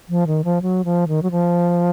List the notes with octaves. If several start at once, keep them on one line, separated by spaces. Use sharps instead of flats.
F3
D#3
F3
F#3
F3
D#3
F#3
F3